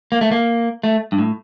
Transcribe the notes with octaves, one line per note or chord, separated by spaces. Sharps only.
A#3
A3
A#3
A3
G2
A2